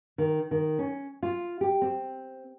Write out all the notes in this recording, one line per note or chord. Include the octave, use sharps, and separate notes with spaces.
D#3
D#3
C#4
F4
G4
C4